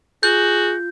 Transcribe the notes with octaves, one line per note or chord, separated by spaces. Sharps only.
F4 F#4 G#4 G6